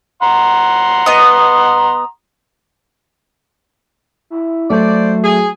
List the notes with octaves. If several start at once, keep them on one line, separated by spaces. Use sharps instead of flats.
F#5 A#5 C6
B3 D#5
E4
F#3 A3 C5 D5
G#4